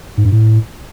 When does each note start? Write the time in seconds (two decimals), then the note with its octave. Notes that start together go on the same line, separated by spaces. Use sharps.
0.17 G#2
0.25 G2
0.32 A2